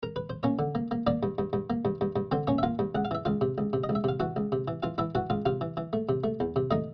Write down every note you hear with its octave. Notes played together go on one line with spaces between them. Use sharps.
A#4
B4
C5
A#3 C#4 C#5
D3
A#3
A#3
A#3 D4 D5
G2
G2
G2
A#3
G2
G2
G2
D3 C4 C5
A#3 C#4 C#5
E5
A#3 F4 F5
G2
C#2 F#5
F5
E3 E5
C#2 F4 F5
C3
C#2
C3
D#5
C#2
E5
C3 F5
E3 F#4 F#5
C#2
C3
E3
E3 F4 F5
E3 E4 E5
E3 F#4 F#5
C#2 F4 F5
C3 F4 F5
E3
E3
A3
C3
A3
E2
C3
A3 D#4 D#5